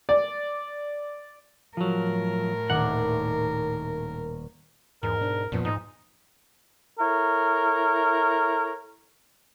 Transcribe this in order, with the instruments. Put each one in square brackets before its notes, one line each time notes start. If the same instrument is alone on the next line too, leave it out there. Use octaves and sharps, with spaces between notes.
[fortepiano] D5
[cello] A2 A#4 [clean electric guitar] F3 F#3
[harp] D#1 [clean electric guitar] F#5
[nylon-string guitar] E2 [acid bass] G#2 [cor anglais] A#4
[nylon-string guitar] B2 D4
[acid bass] F#2 [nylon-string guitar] A#2 F3 B3
[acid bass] G#2 [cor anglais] D#4
[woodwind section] E4 A4 A#4 C#5